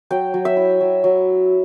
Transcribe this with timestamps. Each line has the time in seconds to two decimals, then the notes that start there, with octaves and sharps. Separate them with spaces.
0.10 F#3 G5
0.34 F#3
0.45 E5
0.57 E4
0.81 F#3
1.04 F#3